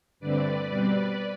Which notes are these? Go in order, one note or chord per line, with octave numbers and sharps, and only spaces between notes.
G2 D3 A3 C4 B4 D5
B2 G3 C4 B4 D5